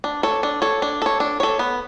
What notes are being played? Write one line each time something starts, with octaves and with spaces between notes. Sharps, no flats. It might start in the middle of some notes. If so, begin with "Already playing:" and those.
D4
A4 C#5
D4
A4 C#5
D4
A4 C#5
D4
A4 C#5
B3